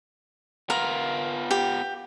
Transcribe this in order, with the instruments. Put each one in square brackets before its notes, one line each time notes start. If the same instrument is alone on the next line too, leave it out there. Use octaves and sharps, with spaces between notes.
[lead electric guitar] B3 F4 [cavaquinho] A#4
[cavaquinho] G4